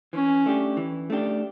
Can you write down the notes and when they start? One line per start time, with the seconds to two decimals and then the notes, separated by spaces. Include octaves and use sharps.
0.13 E3 C#4
0.46 A3 D4 G4
0.77 E3
1.10 A3 D4 G4